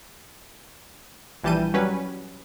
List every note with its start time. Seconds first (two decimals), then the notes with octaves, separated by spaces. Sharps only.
1.44 A#1 E3 G3 A5 G6 D#7
1.74 F#3 G3 C#4 B4